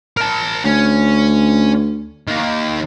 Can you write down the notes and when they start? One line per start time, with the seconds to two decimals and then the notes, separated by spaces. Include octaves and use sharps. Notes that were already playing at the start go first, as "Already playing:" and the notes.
0.17 A#4 A5
0.65 D2 C#4
2.28 D#3 A#3